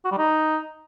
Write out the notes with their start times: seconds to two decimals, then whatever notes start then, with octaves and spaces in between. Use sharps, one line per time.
0.05 F#4
0.11 G3
0.18 D#4